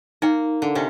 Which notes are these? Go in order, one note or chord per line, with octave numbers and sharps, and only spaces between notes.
A#3 D#4 G5
D3
C3 C#4